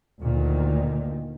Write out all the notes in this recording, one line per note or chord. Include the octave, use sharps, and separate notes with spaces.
D2 A#2 D#3